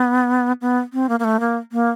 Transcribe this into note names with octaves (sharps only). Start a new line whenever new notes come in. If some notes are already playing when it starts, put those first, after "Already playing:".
Already playing: B3
B3
C4
A#3
A#3
A3
A#3
A#3